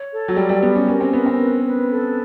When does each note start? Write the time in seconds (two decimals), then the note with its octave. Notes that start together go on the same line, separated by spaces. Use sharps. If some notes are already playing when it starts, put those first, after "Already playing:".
Already playing: C#5
0.11 A4
0.28 F#3
0.36 G3 G4
0.49 G3
0.63 B3 G4
0.75 C#4
0.88 C#4 A#4
1.00 C4
1.13 B3 A#4
1.26 C4
1.40 B4
1.65 B4
1.91 A4